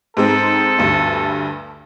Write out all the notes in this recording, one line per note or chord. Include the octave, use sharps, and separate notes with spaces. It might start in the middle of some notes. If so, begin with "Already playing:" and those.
G#2 G#3 C4 A4
D2 G2